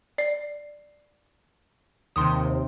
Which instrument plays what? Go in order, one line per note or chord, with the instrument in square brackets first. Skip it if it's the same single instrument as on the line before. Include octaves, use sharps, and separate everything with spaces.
[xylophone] D5 C7
[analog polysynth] D#2 C3 [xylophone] C6 D#6